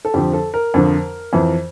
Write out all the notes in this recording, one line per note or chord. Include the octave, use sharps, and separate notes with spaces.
A4
F2 D3 F3 G4
A4
A#4
F2 D3 F3
F2 E3